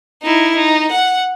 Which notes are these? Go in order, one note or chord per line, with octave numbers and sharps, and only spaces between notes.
D#4 E4
D#4
F#5